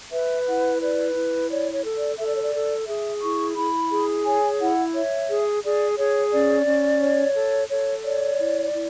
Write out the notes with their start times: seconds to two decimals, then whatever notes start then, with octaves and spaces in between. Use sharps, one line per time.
0.12 B4 E5
0.47 E4 F#5
0.81 B4 D5
1.16 E4
1.50 C#5 D5
1.73 C#5
1.84 A4
1.96 D5
2.19 A4 E5
2.27 D5
2.35 C#5
2.43 D5
2.54 A4
2.88 G#4 E5
3.22 E4 C#6
3.56 E4 B5
3.91 G#4
4.25 C#5 G#5
4.60 E4 F#5
4.94 C#5 E5
5.29 G#4
5.63 G#4 D5
5.97 G#4 C#5
6.32 C#4 D5
6.66 C#4
7.01 C#5
7.35 A4
7.70 A4 C#5
8.04 C#5 D5
8.38 E4
8.73 E4